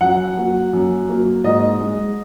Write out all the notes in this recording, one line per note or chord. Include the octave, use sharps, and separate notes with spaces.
F#2 F#5
F#3 A#3
F#2
F#3 A#3
G#2 D#5
G#3